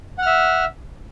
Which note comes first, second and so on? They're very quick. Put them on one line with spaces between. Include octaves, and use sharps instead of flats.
F#5 F6 E5